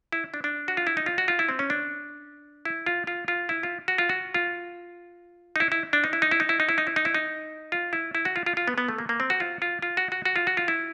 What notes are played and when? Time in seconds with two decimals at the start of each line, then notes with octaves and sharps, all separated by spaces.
0.13 E4
0.34 D4
0.44 D4
0.68 F#4
0.77 F4
0.87 E4
0.97 D#4
1.06 F4
1.18 F#4
1.28 F4
1.39 E4
1.49 C4
1.59 C#4
1.70 D4
2.65 E4
2.86 F4
3.07 F4
3.28 F4
3.49 E4
3.63 F4
3.88 F#4
3.98 F4
4.09 F#4
4.34 F4
5.56 D#4
5.60 E4
5.72 E4
5.93 D4
6.04 D#4
6.13 E4
6.22 D#4
6.31 E4
6.40 D#4
6.49 E4
6.60 D#4
6.69 E4
6.78 D#4
6.87 E4
6.96 D#4
7.05 E4
7.14 D#4
7.72 F4
7.93 E4
8.15 E4
8.25 F#4
8.36 F4
8.46 F4
8.57 F4
8.68 B3
8.78 B3
8.88 A3
8.98 A#3
9.09 A#3
9.20 C4
9.30 F#4
9.40 F4
9.62 F4
9.82 F4
9.97 F#4
10.12 F#4
10.25 F#4
10.36 F4
10.47 F#4
10.57 F4
10.68 E4